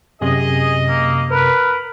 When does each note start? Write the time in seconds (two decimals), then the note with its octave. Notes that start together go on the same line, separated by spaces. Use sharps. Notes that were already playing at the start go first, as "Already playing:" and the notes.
0.21 F#2 C3 G#4 D#5
0.88 A#3
1.30 A#4 B4